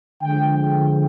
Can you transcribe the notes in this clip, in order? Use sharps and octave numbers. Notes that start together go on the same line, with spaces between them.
D3 F3 G#3 G5
G5